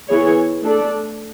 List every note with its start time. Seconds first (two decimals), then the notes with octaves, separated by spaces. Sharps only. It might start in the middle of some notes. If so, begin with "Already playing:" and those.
0.08 E3 B3 E4 G#4 C#5
0.64 A3 D4 A4 D5